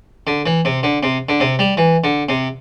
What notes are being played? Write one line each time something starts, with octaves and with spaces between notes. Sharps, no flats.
D3
E3
C3
D3
C3
D3
C3
G3
E3
D3
C3